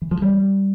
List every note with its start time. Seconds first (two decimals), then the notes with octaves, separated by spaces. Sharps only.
0.02 E3
0.11 F3
0.22 G3